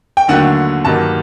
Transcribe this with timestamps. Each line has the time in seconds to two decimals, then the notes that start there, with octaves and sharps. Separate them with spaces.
0.17 G5
0.28 D#2 D3 F#3 A3 F#5
0.85 G2 D#3 F#3 A#3 A5